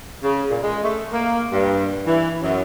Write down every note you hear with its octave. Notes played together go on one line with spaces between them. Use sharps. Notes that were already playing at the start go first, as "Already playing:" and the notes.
C#3
A#2
G#3
A3
A#3
G2
E3
F#2